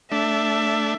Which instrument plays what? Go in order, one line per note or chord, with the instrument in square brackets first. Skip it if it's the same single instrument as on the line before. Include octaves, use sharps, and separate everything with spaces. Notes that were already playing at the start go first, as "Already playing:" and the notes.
[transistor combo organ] A3 D4 [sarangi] E5